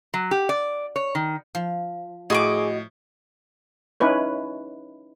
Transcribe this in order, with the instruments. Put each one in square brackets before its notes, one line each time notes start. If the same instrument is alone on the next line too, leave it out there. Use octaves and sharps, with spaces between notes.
[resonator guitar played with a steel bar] F#3
G4
D5
C#5
D#3
[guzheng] F3
[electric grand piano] A2 [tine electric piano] F#4 D#5 [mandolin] G#4 C#6 D6
[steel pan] C#4 D#4 E4 B4 C#5